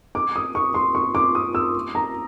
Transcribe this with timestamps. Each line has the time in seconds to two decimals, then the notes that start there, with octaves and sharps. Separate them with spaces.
0.15 D6
0.36 D#6
0.55 C#6
0.74 C6
0.95 C#6
1.15 D6
1.35 D#6
1.55 E6
1.95 A#5